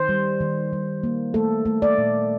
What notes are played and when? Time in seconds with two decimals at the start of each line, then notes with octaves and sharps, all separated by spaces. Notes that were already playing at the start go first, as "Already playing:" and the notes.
Already playing: D#3 C5
0.09 G3
0.40 D#3
0.73 G3
1.03 A#3
1.34 A3 A4
1.65 A3
1.82 D5
1.98 A#2